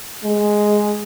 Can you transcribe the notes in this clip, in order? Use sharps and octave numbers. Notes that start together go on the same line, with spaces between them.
G#3